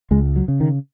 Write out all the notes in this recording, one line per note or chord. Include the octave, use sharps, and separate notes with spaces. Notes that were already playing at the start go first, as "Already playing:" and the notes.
C#2 G#3
F#3
C#3
D#3